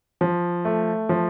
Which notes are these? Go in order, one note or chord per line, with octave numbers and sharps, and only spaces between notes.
F3
A3
F3